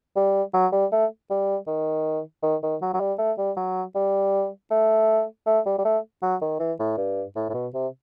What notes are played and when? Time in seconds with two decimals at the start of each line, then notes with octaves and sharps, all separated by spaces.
0.16 G3
0.54 F#3
0.72 G3
0.92 A3
1.30 G3
1.67 D#3
2.43 D#3
2.63 D#3
2.82 F#3
2.93 F#3
3.00 G3
3.18 A3
3.38 G3
3.56 F#3
3.95 G3
4.70 A3
5.46 A3
5.66 G3
5.79 G3
5.85 A3
6.22 F#3
6.41 D#3
6.59 E3
6.79 A2
6.97 G2
7.36 A2
7.49 A2
7.54 B2
7.74 C3